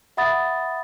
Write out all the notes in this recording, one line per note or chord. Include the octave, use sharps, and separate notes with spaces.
E5 F#5 B5 D#6 A6